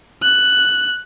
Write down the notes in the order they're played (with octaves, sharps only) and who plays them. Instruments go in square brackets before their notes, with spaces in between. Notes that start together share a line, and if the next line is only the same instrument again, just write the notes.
[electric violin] F#6